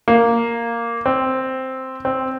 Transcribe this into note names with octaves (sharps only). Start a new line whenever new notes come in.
A#3
C4
C4